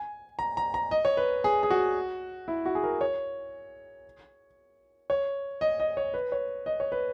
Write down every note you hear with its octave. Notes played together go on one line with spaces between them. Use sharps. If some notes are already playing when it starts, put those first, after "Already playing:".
Already playing: G#5
A#5
A#5
A#5
D#5
C#5
B4
G#4
G#4
F#4
E4
F#4
G#4
A#4
C#5
C#5
D#5
D#5
C#5
B4
C#5
D#5
C#5
B4